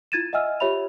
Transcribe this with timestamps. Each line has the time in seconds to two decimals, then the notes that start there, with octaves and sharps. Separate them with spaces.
0.12 E4 F4 G#6 A6 D#7 E7
0.33 D#5 E5 F#5 G#5 E6 F6
0.60 F4 G4 C#5 E5 B5 F7